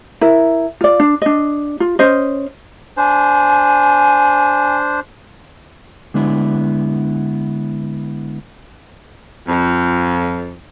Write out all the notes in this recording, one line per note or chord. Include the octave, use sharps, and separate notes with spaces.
E4 A#4
F4 D5
D4
D4 D#5
F4
C#4 C5 D#5
D4 C5 G#5
D3 G#3 B3 D4 E4
F2